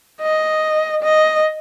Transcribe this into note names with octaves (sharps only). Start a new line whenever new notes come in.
D#5
D#5